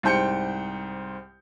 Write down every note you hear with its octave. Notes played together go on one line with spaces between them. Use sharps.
C2 G#2 C5 G5 G6 C#7